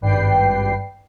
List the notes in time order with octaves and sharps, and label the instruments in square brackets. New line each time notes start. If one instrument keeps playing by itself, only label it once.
[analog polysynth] G#1 G2 B4 D5 G5 C7